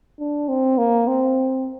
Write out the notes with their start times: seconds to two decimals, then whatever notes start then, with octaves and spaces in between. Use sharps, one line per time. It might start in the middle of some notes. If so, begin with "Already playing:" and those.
0.19 D4
0.49 C4
0.78 A#3
1.07 C4